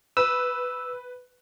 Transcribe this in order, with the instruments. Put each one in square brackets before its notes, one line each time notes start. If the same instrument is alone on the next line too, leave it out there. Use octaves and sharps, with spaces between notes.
[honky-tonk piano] B4 [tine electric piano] E6